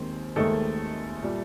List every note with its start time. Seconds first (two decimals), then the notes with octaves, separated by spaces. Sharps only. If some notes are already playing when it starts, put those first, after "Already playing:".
Already playing: D#2 D#3 G#3 C4
0.36 D#2 D#3 G#3 A3 A4
1.23 A#2 G3